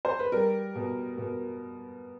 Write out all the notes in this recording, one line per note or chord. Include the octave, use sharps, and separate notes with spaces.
C5
B4
G3 A#4
B2
B2